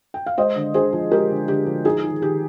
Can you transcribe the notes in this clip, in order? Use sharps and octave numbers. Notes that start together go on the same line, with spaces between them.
G5
F5
G#3 C5 D#5
D3
D3 G#4 C5
F3
G#3 G4 A#4
D3
D3 G4
F3
D#4 G#4
D#3
D#3 G4